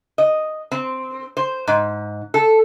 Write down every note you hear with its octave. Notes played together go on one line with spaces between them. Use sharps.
D#5
C4
C5
G#2
A4